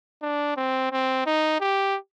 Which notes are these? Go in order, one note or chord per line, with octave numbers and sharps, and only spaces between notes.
D4
C4
C4
D#4
G4